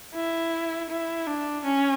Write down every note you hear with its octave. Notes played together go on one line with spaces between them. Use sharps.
E4
E4
D4
C#4